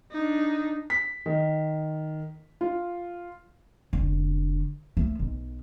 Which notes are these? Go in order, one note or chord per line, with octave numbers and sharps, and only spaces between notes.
D4 D#4
B6
D#3
F4
F1 D3
F3 A3
B1